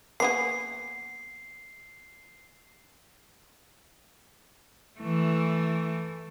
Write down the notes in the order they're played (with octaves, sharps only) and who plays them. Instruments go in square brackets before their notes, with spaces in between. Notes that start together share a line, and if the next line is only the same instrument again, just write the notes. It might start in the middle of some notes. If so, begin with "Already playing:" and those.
[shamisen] A#3 B3 G#4 [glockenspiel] C7
[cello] E3 A3